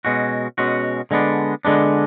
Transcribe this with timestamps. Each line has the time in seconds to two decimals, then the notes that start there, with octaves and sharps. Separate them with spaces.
0.05 B2 G#3 C#4 F#4
0.58 B2 G#3 C#4 F#4
1.11 D3 G#3 B3 D4
1.65 D3 G#3 B3 D4